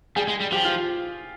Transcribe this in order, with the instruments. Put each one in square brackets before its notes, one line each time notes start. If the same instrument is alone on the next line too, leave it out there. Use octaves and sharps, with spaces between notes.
[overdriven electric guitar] G3 [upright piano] G#4
[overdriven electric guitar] G#3
G3
[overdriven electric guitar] F3 [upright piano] G4
[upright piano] F4